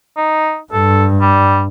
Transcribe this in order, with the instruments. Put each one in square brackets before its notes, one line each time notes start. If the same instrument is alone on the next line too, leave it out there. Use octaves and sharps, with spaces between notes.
[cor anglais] D#4
[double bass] G2 [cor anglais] A4
[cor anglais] G3